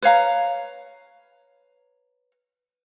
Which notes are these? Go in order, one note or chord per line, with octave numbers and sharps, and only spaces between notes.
B4 C#5 F5 A#5